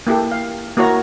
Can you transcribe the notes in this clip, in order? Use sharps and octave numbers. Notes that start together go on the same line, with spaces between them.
A#3 E4 G4 A4
F5
A#3 E4 F#4 A#4 C#5 A#5